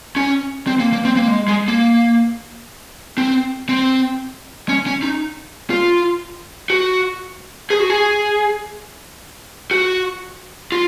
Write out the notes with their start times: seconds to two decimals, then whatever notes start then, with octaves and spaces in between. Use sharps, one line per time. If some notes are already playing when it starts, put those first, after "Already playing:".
0.16 C#4
0.67 C4
0.80 A#3
0.93 A#3
1.05 C4
1.17 A#3
1.28 G#3
1.48 G#3
1.68 A#3
3.18 C4
3.69 C4
4.69 C#4
4.86 C#4
5.03 D#4
5.70 F4
6.70 F#4
7.70 G#4
7.80 F#4
7.90 G#4
9.71 F#4
10.72 F4